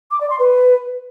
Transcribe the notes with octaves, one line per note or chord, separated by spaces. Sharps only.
D6
D5
C6
B4